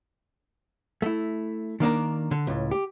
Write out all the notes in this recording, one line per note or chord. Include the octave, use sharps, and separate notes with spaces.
A3 E4
D#3 A#3 D4 A#4
D3
C#2 A2
G4